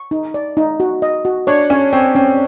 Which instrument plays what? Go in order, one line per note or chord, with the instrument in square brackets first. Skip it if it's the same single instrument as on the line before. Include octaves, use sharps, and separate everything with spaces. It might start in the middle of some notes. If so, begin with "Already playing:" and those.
Already playing: [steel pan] C#6
D#4
D5
D#4
F#4
D#5
F#4
[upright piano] D4 [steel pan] C#5
[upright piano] C#4 [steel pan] C#5
[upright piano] C4 [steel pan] C#5
[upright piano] C4 [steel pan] C#4